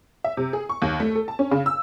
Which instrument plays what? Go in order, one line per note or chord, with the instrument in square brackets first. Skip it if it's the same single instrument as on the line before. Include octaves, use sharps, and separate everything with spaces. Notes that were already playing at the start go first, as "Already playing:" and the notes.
[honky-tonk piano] E5
C3
G#4
C#6
D#2
A3
A4
A5
C#4
C#3
E6